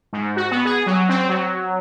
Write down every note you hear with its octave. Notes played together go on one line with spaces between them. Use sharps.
G#2
F#4
B3
G#4
F#3
C4
F#3